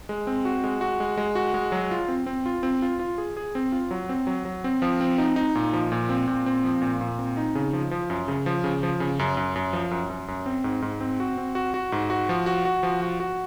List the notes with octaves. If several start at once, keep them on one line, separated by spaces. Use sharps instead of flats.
G#3
C4
F#4
G#3
F#4
G#3
G#3
F#4
G#3
F#3
F4
C4
C4
F4
C4
F4
F4
G#4
G#4
C4
F4
F#3
C4
F#3
F#3
C4
F3
C4
D#4
D#4
A#2
F3
A#2
C4
A#2
C4
F3
A#2
A#2
C4
D#4
C#3
F3
F3
F#2
C#3
F3
C#3
F3
C#3
F#2
F#2
F#2
F3
F#2
F#2
F#2
C4
G#2
G#2
C4
F#4
C4
F#4
F#4
G#2
F#4
F3
F#4
F#4
F3
F#4
F#4